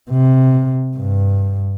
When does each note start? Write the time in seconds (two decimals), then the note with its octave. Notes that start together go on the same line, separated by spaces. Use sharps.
0.11 C3
0.97 G2